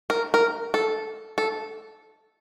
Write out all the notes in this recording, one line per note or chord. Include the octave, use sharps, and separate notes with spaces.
A#4
A#4
A4
A4